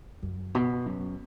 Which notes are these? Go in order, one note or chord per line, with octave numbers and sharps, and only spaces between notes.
F#2
B2
F#2